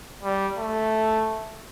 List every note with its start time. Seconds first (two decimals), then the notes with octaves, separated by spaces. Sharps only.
0.23 G3
0.58 A3